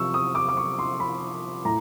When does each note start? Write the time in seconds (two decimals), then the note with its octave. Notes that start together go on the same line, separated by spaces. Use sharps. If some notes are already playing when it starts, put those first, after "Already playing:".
Already playing: C3 F3 C#6 E6
0.14 D#6
0.35 D6
0.48 D6
0.57 C#6
0.78 C6
1.00 B5
1.65 A2 A#5